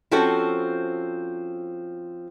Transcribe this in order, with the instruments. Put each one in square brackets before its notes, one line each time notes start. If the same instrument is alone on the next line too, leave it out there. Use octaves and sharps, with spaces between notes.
[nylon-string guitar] F3 C4 C#4 F#4 A4 C5